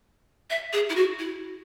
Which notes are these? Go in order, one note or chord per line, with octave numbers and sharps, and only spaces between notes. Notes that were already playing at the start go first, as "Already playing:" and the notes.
E5
G#4
E4
F#4
E4